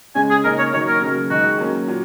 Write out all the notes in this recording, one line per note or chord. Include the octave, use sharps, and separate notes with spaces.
C#3 G#3 C#4 G#5
G#4
C#3 A#3 D#4 A#4
C#5
D#3 F#3 A#3 D#4 C#5
A#4
C#3 F#3 A#3
D#3 G#3 D#4 F#4
F#3 A#3 C#4
A#2 F#3